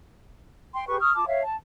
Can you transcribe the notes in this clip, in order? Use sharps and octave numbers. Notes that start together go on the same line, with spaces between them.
G5 C6
G4 G#4 B4 C#6
C#6 D#6 F6
F4 A5 D6
C#5 E5 F5
A5